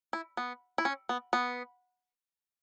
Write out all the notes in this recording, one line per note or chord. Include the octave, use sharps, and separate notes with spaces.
E4
B3
E4
C#4
B3
B3